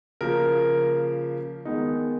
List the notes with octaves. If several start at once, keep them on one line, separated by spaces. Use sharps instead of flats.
C#3 F3 A#3 A#4
D#3 G#3 B3 D#4